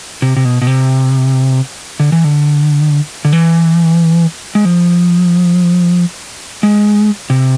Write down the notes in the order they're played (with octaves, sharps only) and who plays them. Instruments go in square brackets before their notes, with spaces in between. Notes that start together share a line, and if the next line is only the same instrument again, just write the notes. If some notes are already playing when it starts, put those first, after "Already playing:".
[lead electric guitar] C3
C3
B2
B2
C3
D3
E3
D3
D3
E3
G#3
F3
G#3
C3